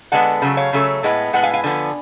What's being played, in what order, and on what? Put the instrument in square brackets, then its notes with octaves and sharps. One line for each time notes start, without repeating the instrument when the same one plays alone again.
[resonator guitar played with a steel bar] D3 G#3 B3 F#5 A5
C#3 F#3 A3
C#5 F5
C#3 F#3 A3
A2 G#3 B3
A2 G#3 B3 F#5
F5 G#5
F5 G#5
D3 F3 B3 G#5